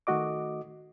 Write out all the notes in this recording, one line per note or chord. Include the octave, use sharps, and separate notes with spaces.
D#3 A3 F#4 D#5 D6